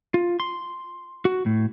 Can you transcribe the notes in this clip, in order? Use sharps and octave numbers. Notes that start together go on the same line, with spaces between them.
F4
C6
F#4
A2